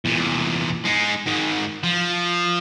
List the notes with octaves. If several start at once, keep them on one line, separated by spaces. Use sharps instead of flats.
E2 A#2
G#3 D#4
G#2 D#3
F3